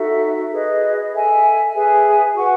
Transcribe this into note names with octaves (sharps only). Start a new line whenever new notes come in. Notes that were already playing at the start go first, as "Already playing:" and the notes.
Already playing: D#4 F#4 A4 E5
G#4 B4 D#5
A4 E5 G#5
G#4 B4 E5 G#5
F#4 B4 F#5 C#6